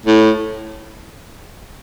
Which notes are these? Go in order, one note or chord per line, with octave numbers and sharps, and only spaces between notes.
A2